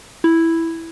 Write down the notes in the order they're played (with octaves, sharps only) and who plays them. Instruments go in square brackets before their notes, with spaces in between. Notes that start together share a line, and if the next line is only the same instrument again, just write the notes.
[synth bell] E4